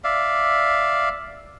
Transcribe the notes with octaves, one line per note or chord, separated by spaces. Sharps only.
D5 E5 F5